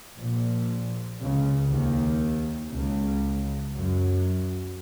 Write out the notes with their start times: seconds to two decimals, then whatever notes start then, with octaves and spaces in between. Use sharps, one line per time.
0.19 A#1 A#2
1.21 C#2 C#3
1.71 D#2 D#3
2.72 C#2 C#3
3.73 F#2 F#3